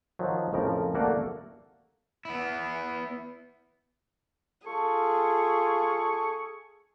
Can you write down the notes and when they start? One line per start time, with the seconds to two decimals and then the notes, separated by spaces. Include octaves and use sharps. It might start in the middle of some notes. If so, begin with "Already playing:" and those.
0.19 D#3 F3 F#3
0.53 F2 A2 C#3 F3 A#4
0.94 A3 A#3 F#4 A4 D5 F#5
2.25 B3 E4
4.67 F4 G#4 A4 C#6